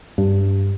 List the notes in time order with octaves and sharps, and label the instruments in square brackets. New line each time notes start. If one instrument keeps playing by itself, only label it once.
[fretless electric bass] G2